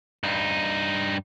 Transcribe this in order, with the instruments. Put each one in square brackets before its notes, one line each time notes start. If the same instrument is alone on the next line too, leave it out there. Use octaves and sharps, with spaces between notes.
[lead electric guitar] G2 D#4